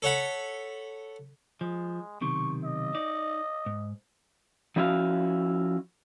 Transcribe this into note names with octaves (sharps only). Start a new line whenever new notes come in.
A4 C#5 F#5 B5
F3 G#3
B1 C3 D#3 C#6
D#5
D#4 D5
G#2
F3 C#4 E4 F#4 F5